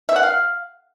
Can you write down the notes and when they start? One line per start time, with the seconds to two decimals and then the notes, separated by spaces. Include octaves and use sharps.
0.09 E5
0.16 F#5
0.23 F5